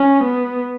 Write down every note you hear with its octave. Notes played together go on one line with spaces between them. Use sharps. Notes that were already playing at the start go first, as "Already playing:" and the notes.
Already playing: C#4
B3